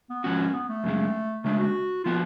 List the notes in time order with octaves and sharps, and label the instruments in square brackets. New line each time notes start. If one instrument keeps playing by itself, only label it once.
[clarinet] B3
[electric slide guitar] G#2 F3 F#4 [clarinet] C#4
[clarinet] B3
A3
[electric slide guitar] F#2 C#3 G#3
[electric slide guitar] C#3 G#3 D4 [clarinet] A3
[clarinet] F#4
[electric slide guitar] F3 B3 F#4 [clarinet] F4